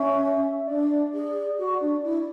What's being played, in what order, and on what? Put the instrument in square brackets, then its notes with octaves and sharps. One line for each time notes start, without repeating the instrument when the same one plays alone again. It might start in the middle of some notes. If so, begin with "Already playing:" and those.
Already playing: [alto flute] C#4 [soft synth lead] E5
[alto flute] D4 [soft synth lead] D5
[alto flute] G#4
F#4
D4
E4